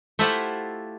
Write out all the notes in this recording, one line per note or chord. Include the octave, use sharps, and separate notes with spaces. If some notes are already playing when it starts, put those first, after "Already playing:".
A3 E4 F4 G4 C5 F#5